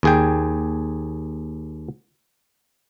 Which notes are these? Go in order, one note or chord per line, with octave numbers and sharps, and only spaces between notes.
D#2 G#4 G5